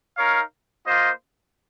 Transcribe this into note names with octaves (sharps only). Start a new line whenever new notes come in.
D#4 A#4 C#5 F5
A#3 F4 C5 D#5